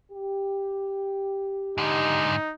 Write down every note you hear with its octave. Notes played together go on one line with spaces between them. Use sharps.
G4
G#2 D3 D#4